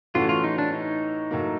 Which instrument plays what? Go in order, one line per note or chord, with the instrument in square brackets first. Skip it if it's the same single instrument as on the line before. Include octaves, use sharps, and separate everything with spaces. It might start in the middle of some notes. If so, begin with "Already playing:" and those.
[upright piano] A2 E3 A3 C#4 F#4 [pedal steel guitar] F4
[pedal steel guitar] F4
D#4
D4
D#4
[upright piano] A2 F#3 A#3